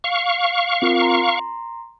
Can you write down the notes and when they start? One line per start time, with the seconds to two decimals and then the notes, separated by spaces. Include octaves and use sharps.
0.04 F5 C#6
0.82 C4 F4 A#4
1.02 A#5 C6